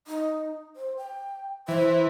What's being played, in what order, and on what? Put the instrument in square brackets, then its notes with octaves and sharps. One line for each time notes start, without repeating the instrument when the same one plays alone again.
[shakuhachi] D#4
C5
G5
[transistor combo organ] E3 [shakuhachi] C5